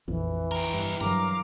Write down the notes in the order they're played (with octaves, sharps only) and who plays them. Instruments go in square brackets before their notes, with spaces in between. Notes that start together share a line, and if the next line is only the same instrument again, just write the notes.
[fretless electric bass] A#1 F2 A#2 [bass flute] E3
[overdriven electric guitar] G4 A#4
[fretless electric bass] G2
[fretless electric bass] G2 D#3 F#3 [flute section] A#4 F5 D6 [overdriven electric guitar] A#5